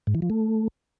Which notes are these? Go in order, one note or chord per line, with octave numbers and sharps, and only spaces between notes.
G#2
E3
F3
A3